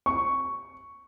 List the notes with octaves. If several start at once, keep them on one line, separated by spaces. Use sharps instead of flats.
C#6